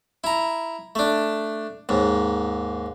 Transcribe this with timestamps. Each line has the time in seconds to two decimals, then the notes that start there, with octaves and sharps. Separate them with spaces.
0.24 E4 A#5
0.95 A3 D4
1.89 D#2 G#2